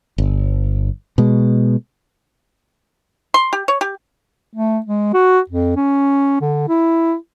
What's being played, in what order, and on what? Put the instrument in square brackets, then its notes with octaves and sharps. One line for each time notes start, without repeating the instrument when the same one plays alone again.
[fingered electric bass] G1
B2 G#3
[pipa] C6
G4
C#5
G4
[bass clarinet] A3
G#3
F#4
F2
C#4
D3
E4